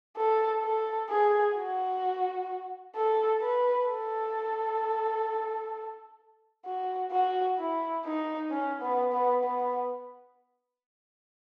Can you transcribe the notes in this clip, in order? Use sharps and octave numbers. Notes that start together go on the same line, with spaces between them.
A4
A4
G#4
F#4
A4
B4
A4
F#4
F#4
E4
D#4
C#4
B3
B3
B3